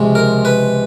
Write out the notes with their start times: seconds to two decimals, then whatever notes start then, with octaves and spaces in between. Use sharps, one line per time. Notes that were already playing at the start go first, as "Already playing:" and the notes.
Already playing: C#2 C3 F3 G#3
0.15 A#4
0.45 B4